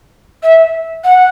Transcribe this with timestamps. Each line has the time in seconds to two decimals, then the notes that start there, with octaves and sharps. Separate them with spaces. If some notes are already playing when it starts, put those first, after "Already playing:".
0.43 E5
1.04 F#5